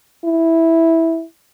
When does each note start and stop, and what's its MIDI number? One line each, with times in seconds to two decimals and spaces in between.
0.25 1.24 64